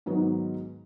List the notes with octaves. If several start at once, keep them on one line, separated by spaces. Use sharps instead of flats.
G#2 D#3 F#3 B3 D#4